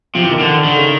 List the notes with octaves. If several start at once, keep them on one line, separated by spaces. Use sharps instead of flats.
C3 F3
E3
D#3
D3
D3 D#3
C#3